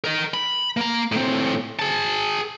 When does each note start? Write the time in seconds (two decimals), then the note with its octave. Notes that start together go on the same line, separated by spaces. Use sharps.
0.04 A#4 D#5
0.34 B5
0.77 A#3 A#5
1.12 A2 C4
1.79 G#4 A5